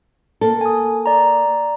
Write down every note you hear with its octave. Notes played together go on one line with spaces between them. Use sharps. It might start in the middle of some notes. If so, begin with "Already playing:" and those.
A#3 A4
G#5 D#6
D5 A#5